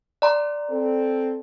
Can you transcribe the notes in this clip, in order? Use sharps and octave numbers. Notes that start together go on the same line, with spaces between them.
D5 A#5 C6
C4 A4